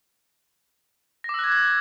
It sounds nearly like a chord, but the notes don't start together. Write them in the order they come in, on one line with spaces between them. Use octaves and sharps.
A#6 D6 E6 F#6 G#6